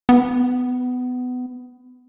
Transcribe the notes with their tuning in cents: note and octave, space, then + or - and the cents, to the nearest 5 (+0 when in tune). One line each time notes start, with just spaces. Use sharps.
B3 +20